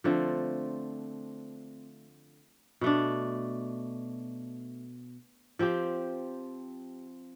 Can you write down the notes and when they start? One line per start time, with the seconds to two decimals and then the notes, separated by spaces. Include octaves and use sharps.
0.04 D3 F3 A3 C4
2.81 B2 A3 D4
5.59 F3 C4 G4